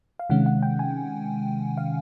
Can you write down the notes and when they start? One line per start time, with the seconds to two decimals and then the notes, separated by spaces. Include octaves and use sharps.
0.19 F5
0.30 C3 D#3 G#3 C#4 F#5
0.46 F#5
0.63 G5
0.79 G#5
1.77 F5